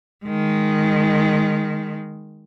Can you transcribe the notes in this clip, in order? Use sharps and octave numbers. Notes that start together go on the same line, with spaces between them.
D#3 G#3